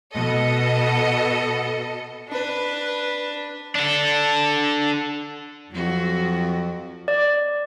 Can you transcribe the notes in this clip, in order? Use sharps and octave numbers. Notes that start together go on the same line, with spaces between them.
B2 A4 D#5 C#7
D4 B4
D4 A4
F2 F#3 F#4
D5